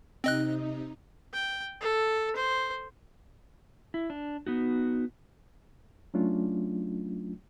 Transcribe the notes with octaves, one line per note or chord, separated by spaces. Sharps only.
C3 C4 D#4 D#5 F#6
G5
A4
C5
E4
D4
B3 D#4 F#4
F#3 A3 C#4 D4 F4